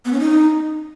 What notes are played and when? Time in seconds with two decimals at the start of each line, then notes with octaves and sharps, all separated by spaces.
0.05 B3
0.13 C#4
0.20 D#4